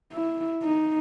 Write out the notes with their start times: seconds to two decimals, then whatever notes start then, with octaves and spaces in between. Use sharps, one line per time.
0.13 E4
0.63 D#4